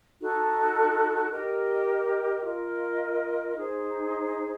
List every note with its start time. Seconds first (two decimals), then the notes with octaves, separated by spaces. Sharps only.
0.19 D#4 F#4 A4
1.30 G4 A#4 D#5
2.43 F4 A#4 D#5
3.56 D#4 G#4 C5